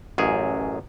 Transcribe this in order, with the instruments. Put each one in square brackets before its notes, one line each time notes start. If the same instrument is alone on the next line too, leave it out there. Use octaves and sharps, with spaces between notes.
[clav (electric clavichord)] A1 F#2 G#4